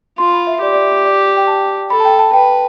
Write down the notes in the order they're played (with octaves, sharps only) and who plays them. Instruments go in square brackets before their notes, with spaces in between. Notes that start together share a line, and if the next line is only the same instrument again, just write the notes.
[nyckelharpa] F4 [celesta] C6
[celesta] B5
E5
[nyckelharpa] G4 [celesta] D5
[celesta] D5
E5
D5
G5
A5
[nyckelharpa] A4 [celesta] B5
[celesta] A5
G5
A5
[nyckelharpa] B4 [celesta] G5